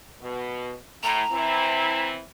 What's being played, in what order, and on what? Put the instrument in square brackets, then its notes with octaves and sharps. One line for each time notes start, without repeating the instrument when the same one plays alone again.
[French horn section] B2
[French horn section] A2 [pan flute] A#5
[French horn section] E3 C4 E4